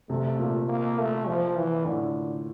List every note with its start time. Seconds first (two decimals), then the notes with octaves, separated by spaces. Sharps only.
0.10 C3 A3
0.39 A#2
0.69 A#3
0.98 A3
1.27 F3
1.56 E3
1.85 A2 D3